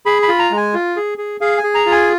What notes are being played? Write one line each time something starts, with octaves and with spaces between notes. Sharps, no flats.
G#4 B5
B5
F4
A#5
G#3
G#5
F4
G#4
G#4
G#4 F5
G#5
G#4
A#5
F4
G#5